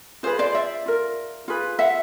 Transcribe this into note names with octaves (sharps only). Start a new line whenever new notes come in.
F4 G#4 B4 C5
C5 D5
D5 E5
F4 A#4
F4 G#4 B4
E5 F#5